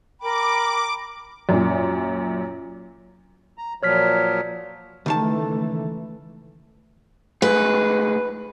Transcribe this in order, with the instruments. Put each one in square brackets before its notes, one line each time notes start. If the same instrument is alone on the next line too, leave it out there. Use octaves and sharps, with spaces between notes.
[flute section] A#4 G5 B5 [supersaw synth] D6
[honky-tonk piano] F#2 A#2
[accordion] A#5
[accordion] A#2 F3 F#3 [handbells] C#5 F6 B6
[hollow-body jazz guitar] C#2 D#3 A5 [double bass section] E3 A3
[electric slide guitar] A3 D#4 G#4 [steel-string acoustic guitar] B4